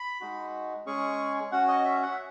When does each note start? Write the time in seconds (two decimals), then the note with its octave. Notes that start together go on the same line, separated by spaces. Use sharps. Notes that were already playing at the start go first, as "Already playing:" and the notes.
Already playing: B5
0.21 G#3 D#4 F#4
0.86 G#3 C#4 G#4 C#6
1.52 C#4 F#4 F#5
1.68 D#5
1.85 E5
2.02 F#5
2.11 E5